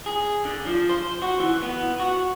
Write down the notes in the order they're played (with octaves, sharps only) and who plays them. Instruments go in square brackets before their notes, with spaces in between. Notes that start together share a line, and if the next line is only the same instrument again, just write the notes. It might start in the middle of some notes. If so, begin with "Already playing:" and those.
[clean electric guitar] G#4
D3
F3
C5
F#4
E3
B3
F#4